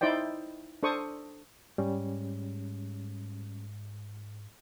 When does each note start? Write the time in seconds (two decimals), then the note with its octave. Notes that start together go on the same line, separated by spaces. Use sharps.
0.01 D#4 E4 C5 D5 G5
0.83 D4 A4 C5 C#6 D#6
1.78 G#2 G3 C#4